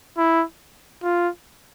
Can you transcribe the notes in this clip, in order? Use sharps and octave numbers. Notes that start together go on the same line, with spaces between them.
E4
F4